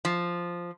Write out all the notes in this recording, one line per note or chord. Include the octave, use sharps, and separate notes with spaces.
F3